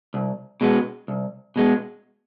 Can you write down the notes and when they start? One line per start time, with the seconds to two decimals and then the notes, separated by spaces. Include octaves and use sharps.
0.14 C2
0.61 B2 G#3 B3
1.08 C2
1.56 B2 G#3 B3